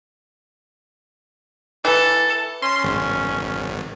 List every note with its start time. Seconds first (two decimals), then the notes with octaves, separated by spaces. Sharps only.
1.85 E3 A4
2.62 C#4 C6
2.84 G#1